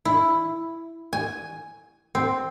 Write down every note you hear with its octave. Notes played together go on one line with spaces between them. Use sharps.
E4
G#5
C4